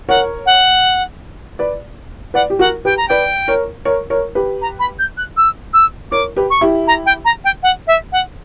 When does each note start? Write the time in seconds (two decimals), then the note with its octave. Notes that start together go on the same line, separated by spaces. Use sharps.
0.08 A#4 C#5 F#5
0.46 F#5
1.59 B4 D5
2.34 B4 D5 F#5
2.50 G4
2.59 F#4 A#4 F#5
2.85 G4 B4 G5
2.97 A#5
3.08 B4 D5 G5
3.48 A#4 C#5
3.85 A#4 C#5
4.10 A#4 C#5
4.35 G4 B4
4.61 A#5
4.79 B5
4.99 G6
5.17 F#6
5.37 E6
5.73 E6
6.11 A#4 C#5 D6
6.36 G4 B4
6.50 C#6
6.61 E4 G4
6.87 A#5
7.06 G5
7.25 A#5
7.44 G5
7.63 F#5
7.87 E5
8.12 F#5